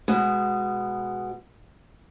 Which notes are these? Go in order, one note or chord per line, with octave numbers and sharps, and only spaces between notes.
B2 G#3